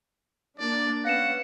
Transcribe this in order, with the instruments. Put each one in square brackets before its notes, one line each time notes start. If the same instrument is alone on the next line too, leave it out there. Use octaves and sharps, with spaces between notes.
[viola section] A#3 D4 [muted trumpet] D5
[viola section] B3 C#4 [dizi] F5 [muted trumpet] F#5 [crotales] A#6 C#7 E7